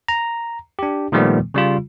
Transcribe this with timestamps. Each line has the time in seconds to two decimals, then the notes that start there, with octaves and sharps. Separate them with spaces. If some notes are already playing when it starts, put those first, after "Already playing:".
0.08 A#5
0.79 D4 G4
1.12 A#2 D#3 F3 G3 A3 B3
1.54 C#3 G3 F4